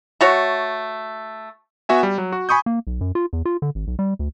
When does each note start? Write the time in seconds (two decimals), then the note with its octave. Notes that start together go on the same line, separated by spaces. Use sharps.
0.21 A3 F#4 C#5
1.89 B3 F#4 E5 G#5
2.03 G3
2.18 F#3
2.32 F#4
2.49 G#5 B5 C#6 D#6 G6
2.66 A#3
2.87 B1
3.01 F#2
3.15 F4
3.33 E2
3.45 F4
3.62 D3
3.75 G#1
3.87 B1
3.99 G3
4.19 D2